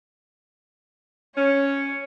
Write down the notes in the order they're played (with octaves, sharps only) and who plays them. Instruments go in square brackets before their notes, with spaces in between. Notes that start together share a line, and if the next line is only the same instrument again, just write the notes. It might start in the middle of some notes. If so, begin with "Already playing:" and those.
[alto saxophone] C#4 [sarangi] C#5